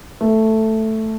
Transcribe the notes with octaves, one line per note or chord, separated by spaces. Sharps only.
A3